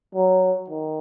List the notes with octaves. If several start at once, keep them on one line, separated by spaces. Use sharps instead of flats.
F#3
D#3